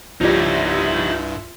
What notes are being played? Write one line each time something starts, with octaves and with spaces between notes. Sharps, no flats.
C2 G2 F3 G3 D#4 F4 C#5 E5